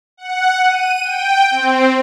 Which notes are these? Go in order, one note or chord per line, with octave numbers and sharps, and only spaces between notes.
F#5
D#7
G5
C4